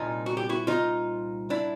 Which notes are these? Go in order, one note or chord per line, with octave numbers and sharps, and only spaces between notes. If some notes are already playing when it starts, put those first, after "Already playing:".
Already playing: C2 A#2 D#4 F4
F#4
G4
E4 F#4
D#4 F4
D4 E4